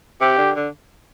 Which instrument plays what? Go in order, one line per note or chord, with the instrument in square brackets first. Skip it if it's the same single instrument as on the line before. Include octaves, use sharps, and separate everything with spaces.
[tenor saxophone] C3 [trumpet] G4
[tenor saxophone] D3
D3